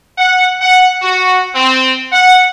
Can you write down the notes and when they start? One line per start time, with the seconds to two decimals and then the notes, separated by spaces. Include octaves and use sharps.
0.18 F#5
0.61 F#5
1.02 F#4
1.55 C4
2.13 F#5